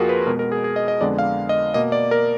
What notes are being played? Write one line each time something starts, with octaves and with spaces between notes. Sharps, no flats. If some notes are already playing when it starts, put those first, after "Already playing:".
Already playing: F2 F3 A#3 F4 F#4 G#4 A#4
B4
B2 G#3 B3 A#4
A#4
G#4
G#4
D#5
D#5
F2 D3 G#3 B3 D5
F5
D#5
B2 A#3 D#5
D5
A#4